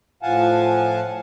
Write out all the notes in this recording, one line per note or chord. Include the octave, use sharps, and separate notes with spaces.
A2 F3 F5 F#5 G#5 A5